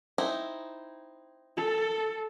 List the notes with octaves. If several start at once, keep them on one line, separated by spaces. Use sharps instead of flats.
C4 D#4 E4
A4